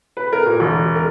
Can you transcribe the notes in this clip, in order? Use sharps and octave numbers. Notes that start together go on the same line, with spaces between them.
B4
A#4
A#2
E1
A#4